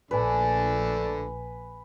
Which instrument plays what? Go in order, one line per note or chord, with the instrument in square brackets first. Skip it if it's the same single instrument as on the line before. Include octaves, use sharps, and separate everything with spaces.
[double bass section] A#1 [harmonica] D3 A3 D4 [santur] B4 G#5